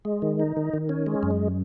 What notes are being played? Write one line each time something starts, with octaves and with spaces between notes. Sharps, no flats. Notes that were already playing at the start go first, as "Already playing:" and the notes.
G#3
D#3
D#4
D#3
D#3
C#4
G#3
F#2